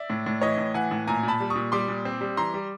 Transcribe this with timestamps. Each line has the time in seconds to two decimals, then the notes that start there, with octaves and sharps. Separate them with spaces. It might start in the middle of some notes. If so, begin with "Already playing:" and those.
Already playing: D5 E5
0.10 A2
0.26 A2
0.41 E3 C#5 D#5
0.58 A2
0.74 E3 F#5 G#5
0.91 A2
1.07 A#2 G#5 A#5
1.23 A#2
1.28 A5 B5
1.40 G3
1.50 C#6 D#6
1.55 A#2
1.72 G3 C6 D6
1.88 A#2
2.05 C4
2.21 G3
2.37 E3 A#5 C6
2.54 G3